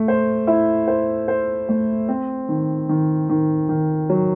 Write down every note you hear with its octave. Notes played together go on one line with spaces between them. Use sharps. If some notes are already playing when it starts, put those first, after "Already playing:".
Already playing: A3
C5
E4
C5
C5
A3
C4
D#3
D#3
D#3
D#3
F#3